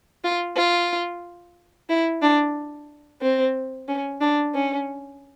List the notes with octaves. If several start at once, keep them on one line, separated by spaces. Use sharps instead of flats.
F4
F4
E4
D4
C4
C#4
D4
C#4